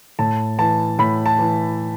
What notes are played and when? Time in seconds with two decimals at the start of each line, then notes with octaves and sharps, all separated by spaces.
0.19 A2 A5
0.58 E3 A5
0.99 A2 B5
1.26 A5
1.39 E3